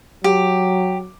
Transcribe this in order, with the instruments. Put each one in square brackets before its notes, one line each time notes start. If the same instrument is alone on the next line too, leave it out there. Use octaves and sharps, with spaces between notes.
[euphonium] F#3 [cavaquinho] G4